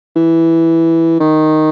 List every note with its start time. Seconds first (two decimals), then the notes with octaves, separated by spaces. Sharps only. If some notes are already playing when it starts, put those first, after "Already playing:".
0.16 E3
1.20 D#3